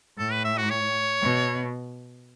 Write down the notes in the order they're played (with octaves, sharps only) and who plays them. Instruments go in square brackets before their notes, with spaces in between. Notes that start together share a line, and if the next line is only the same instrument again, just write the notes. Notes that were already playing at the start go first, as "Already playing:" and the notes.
[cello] A2 [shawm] A4
[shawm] B4
E5
F#4
C#5
[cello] B2